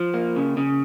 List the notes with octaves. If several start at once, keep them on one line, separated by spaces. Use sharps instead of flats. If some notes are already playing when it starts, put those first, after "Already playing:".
Already playing: F3
A#3
C#3
C#3